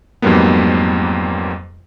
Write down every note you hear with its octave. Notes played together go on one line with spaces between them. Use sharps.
F2 G#2 F#3 G3 A#3 B3